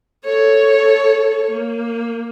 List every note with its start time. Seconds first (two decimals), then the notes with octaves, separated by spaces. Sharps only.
0.25 A4 C#5
1.51 A#3